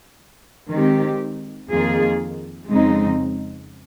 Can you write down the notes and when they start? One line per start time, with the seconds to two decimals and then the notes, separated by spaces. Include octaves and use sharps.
0.69 D#3 G#3 C4 G4
1.69 F2 D#3 A#3 F4 G#4
2.70 F2 C#3 G#3 C4 D#4